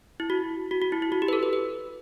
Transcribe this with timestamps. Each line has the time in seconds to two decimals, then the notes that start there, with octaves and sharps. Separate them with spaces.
0.20 E4
0.30 F#4
0.71 F#4
0.82 F#4
0.92 E4
1.02 E4
1.12 F#4
1.22 G4
1.28 B4
1.33 A4
1.43 B4
1.53 B4